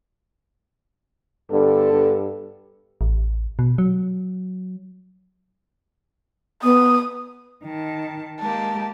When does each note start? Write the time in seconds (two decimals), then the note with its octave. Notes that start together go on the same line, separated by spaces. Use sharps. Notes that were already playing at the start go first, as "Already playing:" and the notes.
1.51 G2 D3 B3 A4
1.92 G2
3.01 A1
3.59 B2
3.78 F#3
6.63 B3 D#6
7.64 D#3 A5
8.41 G#3 A#3 G4 A5